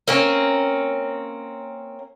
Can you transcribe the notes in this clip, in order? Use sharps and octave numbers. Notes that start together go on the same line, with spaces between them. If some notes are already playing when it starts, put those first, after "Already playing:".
A#3 C4 C#4